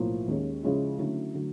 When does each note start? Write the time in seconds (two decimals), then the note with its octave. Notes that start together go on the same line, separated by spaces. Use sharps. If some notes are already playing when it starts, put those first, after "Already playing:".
Already playing: B1 A2 F3 A#3
0.27 D#2 D#3 G#3 C#4
0.63 C#3 F3 G#3 C#4 E4
0.98 D3 F#3 A3 C#4 E4
1.34 D3 F#3 A3